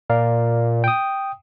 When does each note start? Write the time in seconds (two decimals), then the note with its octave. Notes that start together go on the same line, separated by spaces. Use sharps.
0.10 A#2 A#4 D5 F5
0.84 G5 D#6